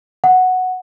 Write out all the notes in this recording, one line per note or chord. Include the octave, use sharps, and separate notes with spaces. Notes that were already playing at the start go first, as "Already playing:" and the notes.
F#5